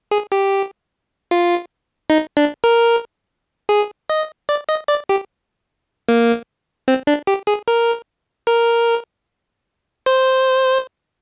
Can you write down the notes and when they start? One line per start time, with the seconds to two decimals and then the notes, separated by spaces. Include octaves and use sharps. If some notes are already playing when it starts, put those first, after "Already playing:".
0.11 G#4
0.32 G4
1.31 F4
2.10 D#4
2.37 D4
2.64 A#4
3.69 G#4
4.10 D#5
4.49 D5
4.69 D#5
4.88 D5
5.09 G4
6.09 A#3
6.88 C4
7.07 D4
7.27 G4
7.47 G#4
7.68 A#4
8.47 A#4
10.06 C5